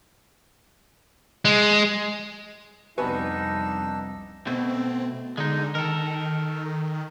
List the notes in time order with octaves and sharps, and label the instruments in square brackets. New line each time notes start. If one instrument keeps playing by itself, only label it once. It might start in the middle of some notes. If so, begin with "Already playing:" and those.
[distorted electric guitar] G#3
[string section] C2 F2 [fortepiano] B3 F#4 G#5 [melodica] D4 E6 [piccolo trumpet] D#4
[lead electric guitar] B2 A3 [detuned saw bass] C4
[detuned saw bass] D3 [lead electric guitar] G#3 D#4
[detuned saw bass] D#3 [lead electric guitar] A4 A#4